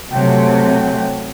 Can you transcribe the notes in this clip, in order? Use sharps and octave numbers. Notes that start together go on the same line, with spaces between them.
C3 F#3 A3 G5